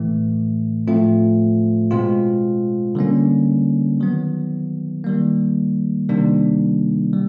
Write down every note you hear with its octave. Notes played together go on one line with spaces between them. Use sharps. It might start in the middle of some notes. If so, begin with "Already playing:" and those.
Already playing: A2 E3 A3
A2 F3 A3 C4 F4
B2 G#3 C4 F4
D3 G3 A#3 C#4
D#3 F#3 B3
D#3 G3 A#3
C3 D#3 G3 A#3 D4
G3